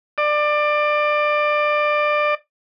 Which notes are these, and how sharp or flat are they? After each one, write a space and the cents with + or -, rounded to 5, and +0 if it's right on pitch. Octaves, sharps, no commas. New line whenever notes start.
D5 +20